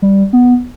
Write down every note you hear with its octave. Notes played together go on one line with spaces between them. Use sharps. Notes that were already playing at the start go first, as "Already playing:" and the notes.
G3
B3